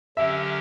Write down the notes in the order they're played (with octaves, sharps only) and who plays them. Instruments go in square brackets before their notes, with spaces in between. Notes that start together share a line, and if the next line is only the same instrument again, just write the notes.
[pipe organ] D3 F#3 C#4 G4 A#4 [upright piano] E5